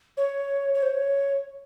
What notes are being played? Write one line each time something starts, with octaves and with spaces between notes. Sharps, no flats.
C#5
C#5
C5
C#5